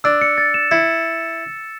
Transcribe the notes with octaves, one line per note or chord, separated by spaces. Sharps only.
D4 E6
C#7
A6
E7
E4 C#7